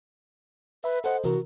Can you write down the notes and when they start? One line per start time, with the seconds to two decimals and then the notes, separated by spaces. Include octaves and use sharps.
0.84 B4 E5 B5
1.04 A4 C5 D#5 F#5
1.24 C3 E3 F#4 A#4